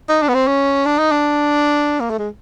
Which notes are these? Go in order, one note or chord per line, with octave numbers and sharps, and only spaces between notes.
D#4
D4
B3
C4
C#4
D4
D#4
D4
A#3
A3
G#3